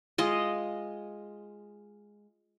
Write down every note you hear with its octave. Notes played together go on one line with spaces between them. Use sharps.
G#3 F4 D#5